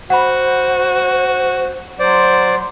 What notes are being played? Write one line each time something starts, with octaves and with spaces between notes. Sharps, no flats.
F#4 C5 F#5 B5
F#3 C5 D5 C6